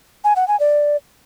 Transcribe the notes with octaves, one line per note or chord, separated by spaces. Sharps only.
G#5
F#5
G#5
D5